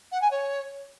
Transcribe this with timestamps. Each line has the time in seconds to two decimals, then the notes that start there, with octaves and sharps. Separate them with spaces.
0.12 F#5
0.21 G#5
0.31 C#5